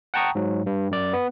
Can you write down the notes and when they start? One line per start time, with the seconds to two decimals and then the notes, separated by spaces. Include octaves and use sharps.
0.14 F#5 G5 A5 A#5 C#6 D#6
0.35 G#2 F#3
0.66 G2
0.91 F#2 D5
1.13 B3